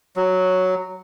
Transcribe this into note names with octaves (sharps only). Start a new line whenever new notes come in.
F#3